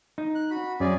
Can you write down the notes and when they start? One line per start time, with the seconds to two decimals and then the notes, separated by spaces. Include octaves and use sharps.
0.18 D#4
0.35 F#6
0.50 F#4 B5
0.80 F#2 C#4 G#4 D5